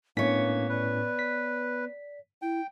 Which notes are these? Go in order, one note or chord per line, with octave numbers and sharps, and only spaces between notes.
A2 A#3 B3 C#4 D4 C#5 B6
B4 D5
B6
E4 G5